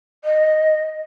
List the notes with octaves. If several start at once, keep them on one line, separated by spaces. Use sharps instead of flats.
D#5